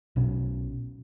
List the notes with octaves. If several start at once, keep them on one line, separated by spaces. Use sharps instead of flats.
B1 B2 C#4